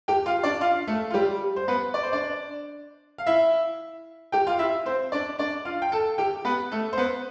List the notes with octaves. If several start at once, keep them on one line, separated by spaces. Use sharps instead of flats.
G4 G5
F4 F5
D4 D5
F4 F5
A3 A4
F4
G3 G4
C5
B3 B4
D5
C5
D4 D5
F5
E4 E5
G4 G5
F4 F5
E4 E5
C4 C5
D4 D5
D4 D5
F4 F5
G5
A4 A5
G4 G5
B3 B4
A3 A4
C5
B3 B4